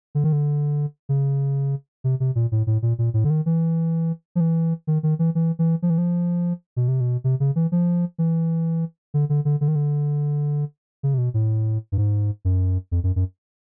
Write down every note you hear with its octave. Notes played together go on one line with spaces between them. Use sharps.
D3
D#3
D3
C#3
C3
C3
A#2
A2
A2
A#2
A#2
A2
D3
D#3
E3
F3
E3
D#3
D#3
E3
E3
E3
F3
E3
F3
B2
C3
B2
C3
C#3
E3
F3
E3
D3
D3
D3
D3
D#3
D3
C#3
C3
B2
A2
G2
G#2
F#2
F2
F#2
F#2